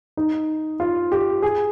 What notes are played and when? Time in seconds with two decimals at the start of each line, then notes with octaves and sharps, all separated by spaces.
0.17 D#4
0.80 F4
1.12 G4
1.42 G#4